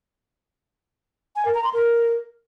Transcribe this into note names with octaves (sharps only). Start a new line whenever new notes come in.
G#5
A#4
A#5
C6
A#4